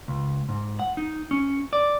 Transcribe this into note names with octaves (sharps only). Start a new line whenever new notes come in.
C#2
G#2
F#5
D#4
C#4
D5